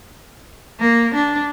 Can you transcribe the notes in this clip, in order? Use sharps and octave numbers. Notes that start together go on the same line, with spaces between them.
A#3
D4